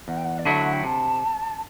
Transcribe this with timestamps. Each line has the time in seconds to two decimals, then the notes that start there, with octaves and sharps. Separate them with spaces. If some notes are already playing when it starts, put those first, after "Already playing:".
0.08 E2 F#5
0.17 G5
0.25 F#5
0.38 D5
0.45 D3 F#3 A3 E4 E5
0.61 F#5
0.73 G5
0.84 C3 A5